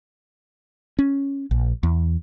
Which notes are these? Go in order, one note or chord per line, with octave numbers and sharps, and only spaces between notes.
C#4
A#1
E2